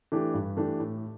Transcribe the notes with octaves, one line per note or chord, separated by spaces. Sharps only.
E3 A3 D4 G4
G2
E3 A3 D4 G4
A2